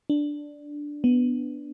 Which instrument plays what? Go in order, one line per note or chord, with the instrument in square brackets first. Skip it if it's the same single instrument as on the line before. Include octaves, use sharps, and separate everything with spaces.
[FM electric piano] D4
B3